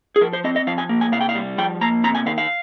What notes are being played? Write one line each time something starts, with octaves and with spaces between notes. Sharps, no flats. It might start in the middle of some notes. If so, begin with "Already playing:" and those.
G#4
F3 A#4
C5
C4 D#5
D#5
F3 F5
G#5
A#3
G#5
C3 F5
G5
F5
G3
F3 G5
A#3 A#5
C3 A#5
G#5
D#3 F5
F5